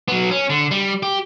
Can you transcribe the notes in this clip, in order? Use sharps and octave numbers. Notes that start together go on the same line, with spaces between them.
F#3 B3
C#4
D3
G3
G4